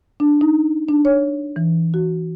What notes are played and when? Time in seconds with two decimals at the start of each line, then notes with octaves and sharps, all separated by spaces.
0.20 D4
0.41 D#4
0.89 D4
1.05 C#5
1.56 E3
1.94 F#4